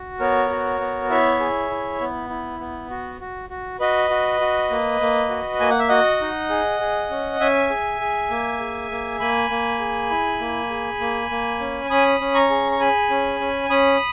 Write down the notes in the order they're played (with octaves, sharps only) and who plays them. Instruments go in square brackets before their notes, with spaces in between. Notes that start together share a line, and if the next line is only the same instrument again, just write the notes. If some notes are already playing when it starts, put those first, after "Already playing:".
Already playing: [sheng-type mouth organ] F#4
B3 A#4 C#5
F#4
B3
E4 C#5 E5
G#4
E4
B3
E4
B3
F#4
F#4
F#4
F#4 B4 D#5
F#4
F#4
A#3
A#3
F#4
A#3 G#5
F#5
E5
F#4 D#5 F#5
D#4
G#4
G#4
C#4
C#4 E5 G#5
G#4
G#4
A#3
G#4
A#3
A#3 G#5 B5
A#3
G#4
E4
A#3
G#4
A#3
A#3
C#4
C#4 B5 D#6
C#4
A#5 C#6
G#4
C#6
G#4 G#5 B5
C#4
C#4
C#4 B5 D#6